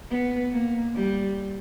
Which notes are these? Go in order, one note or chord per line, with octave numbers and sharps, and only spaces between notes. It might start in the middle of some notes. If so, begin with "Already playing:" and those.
B3
A#3
G3